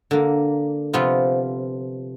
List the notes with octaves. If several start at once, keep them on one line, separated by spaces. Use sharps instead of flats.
D3 A#3
C3 F3 B3 F4